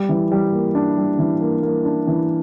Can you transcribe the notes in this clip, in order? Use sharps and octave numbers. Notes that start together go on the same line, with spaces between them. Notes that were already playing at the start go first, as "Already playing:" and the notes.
Already playing: G3
E3
G3
A#3
D4
G3
E3
A#3
A#3
D4
E3